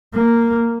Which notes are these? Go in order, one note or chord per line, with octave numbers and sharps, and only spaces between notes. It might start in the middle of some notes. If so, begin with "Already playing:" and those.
A#3